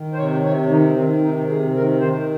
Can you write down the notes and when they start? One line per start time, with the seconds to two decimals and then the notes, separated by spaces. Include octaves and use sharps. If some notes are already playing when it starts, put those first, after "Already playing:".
Already playing: D#3
0.13 C5
0.18 C3 C#5
0.44 C3 C#5
0.70 D#3 D#4
0.96 D#3 C4
1.22 C3 D#4
1.48 C3 G#4
1.75 D#3 A#4
2.00 D#3 C5